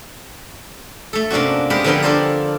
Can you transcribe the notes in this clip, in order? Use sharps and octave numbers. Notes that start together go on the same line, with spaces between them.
A3 A4
C3 A#3 C#4 D4 F#4
G#3 B3 G4 A#4 B4
D3 F3 G3 B3 A#4 G5
D4 F4 A4 A#4 C5 D5